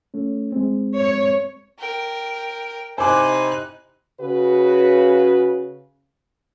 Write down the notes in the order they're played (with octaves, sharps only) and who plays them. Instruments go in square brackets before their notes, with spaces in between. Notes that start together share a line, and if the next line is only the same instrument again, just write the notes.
[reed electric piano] A3 C#4
G#3 C4
[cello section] C#5
[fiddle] A#4 G5
[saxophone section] C3 E4 C5 [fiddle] D#4 F#6 [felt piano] G#5 D6
[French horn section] C#3 F#4 B4